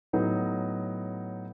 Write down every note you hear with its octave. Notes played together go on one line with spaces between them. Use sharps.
A2 F#3 B3 D#4